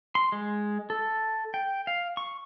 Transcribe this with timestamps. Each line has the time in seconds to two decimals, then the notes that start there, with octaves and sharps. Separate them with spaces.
0.15 C6
0.32 G#3
0.90 A4
1.54 G5
1.87 F5
2.17 C#6